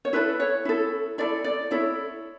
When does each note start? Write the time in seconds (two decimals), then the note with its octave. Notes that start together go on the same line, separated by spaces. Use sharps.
0.05 C#5
0.13 E4 A4 B4
0.40 C#5
0.65 E4 A4
1.18 E4 A4 D5
1.44 D5
1.71 E4 A4 C#5